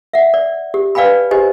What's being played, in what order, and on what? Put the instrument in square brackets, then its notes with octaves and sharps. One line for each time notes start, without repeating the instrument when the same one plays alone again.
[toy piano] E5 F#5
D5
G4
B4 D5 F5 G5 G#5 B5
G4 C5 D#5 G#5